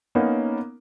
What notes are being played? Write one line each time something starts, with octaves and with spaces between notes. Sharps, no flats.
A#3 B3 C#4 D#4